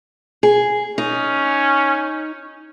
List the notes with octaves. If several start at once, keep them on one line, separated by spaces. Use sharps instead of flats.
G#4
C#4 D#4